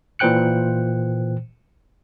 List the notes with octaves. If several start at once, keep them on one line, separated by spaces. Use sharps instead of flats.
A#2 E3 C5 G5 F#6 C#7